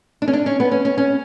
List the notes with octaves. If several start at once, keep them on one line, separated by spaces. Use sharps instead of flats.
D4
C#4
D4
C#4
B3
C#4
C#4
C#4